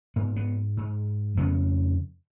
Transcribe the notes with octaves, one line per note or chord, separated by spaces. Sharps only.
G#2 B3
B3
G#2
F2 C#3 B3